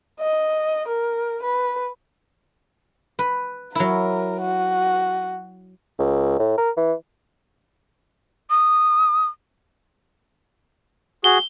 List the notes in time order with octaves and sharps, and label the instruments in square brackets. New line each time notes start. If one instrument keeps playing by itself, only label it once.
[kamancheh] D#5
A#4
B4
[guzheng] B4
[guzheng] F#3 E4 [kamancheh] A#4
[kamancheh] F#4
[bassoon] C#2
A2
A#4
E3
[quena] D#6
[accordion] F#4 G#4 [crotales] G7